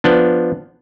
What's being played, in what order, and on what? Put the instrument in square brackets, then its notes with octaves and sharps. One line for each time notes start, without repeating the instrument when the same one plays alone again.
[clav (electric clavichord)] F3 B3 D4